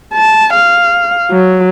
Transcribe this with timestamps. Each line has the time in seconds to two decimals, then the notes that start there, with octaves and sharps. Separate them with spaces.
0.13 A5
0.53 F5
1.31 F#3